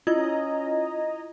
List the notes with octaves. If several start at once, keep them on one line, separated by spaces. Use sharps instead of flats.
C#4 E4 F4 D#5 A#5 G#6